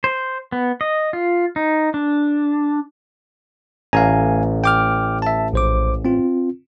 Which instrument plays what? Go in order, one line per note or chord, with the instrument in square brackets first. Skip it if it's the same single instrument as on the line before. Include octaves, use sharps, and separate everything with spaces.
[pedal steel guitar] C5
B3
D#5
F4
D#4
D4
[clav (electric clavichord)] A1 A#5 [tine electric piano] F5 G#5
[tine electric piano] G5 D6 F6
E5 A5
A#1 C5 D6
C4 F4